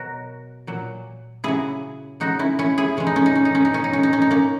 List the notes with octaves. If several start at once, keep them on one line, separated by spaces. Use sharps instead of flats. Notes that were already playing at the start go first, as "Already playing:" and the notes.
Already playing: B2 F#3 F#4 A#4
A#2 F#3
C#3 F#3 E4 G#4
C#3 F#3 D#4 F#4
C#4 E4
C#4 E4
E4 G#4
C#3 E3 G#3 C#4
D#4
C#4
D#4
C#4
D#4
C#4
D#4
B2 F#3 C#4
D#4
C#4
D#4
C#4
D#4
A#3 C#4